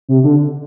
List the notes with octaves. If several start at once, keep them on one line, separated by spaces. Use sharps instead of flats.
C3
D3